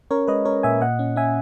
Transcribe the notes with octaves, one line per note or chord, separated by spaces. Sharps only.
C#4 A#4 C#5
G#3 B4 D#5
C#4 A#4 C#5
A#2 E5 G#5
A#2 D#5 F#5
C#4
C#4 E5 G#5